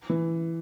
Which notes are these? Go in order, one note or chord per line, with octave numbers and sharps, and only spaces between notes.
E3